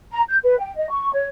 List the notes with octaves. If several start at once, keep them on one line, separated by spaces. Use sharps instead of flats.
A#5
G6
B4
G5
D#5
C#6
C#5